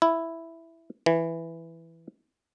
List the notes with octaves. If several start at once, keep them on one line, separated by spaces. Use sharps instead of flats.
E4
E3